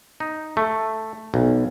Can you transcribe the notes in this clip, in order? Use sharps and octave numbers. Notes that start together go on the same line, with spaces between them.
D#4
A3
B1